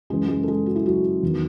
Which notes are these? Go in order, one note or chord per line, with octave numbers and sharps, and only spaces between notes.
F#2 C#3 E3 G#3 G#4
G#3 G#4
A4
G#3 G#4
F#4
E4
F#3 F#4
E2 D#3